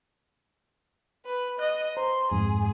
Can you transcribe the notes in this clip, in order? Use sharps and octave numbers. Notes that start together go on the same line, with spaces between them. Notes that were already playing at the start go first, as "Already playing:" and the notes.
B4
D#5 F#6
C5 A#5 C6
F2 G#2 G#4